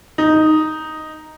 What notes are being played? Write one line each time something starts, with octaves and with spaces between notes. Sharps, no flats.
D#4